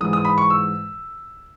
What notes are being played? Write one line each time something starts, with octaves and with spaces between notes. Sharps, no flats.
G#2 E3 G#3 D#6
D#6
B5
C#6
E6